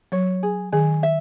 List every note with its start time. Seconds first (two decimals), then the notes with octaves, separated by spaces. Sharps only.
0.12 F#3 C#5
0.43 G#4
0.72 D#3 G#4
1.03 E5